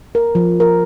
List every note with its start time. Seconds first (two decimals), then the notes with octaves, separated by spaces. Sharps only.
0.15 A#4
0.35 F3
0.60 A#4